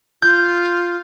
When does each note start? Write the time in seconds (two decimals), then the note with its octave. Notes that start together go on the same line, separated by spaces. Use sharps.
0.22 F4 G6